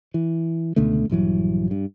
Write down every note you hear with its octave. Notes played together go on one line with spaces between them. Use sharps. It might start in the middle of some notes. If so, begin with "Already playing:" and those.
E3
C#2 B2 D3 A3
A#1 G2 E3 F#3
G2